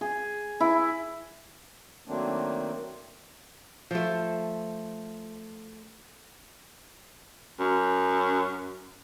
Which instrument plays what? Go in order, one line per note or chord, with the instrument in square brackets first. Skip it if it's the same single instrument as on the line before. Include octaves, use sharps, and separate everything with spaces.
[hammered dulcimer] G#4
E4
[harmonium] D#3 F#3 A3 A#3 C4 D4
[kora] F3 A3
[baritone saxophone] F#2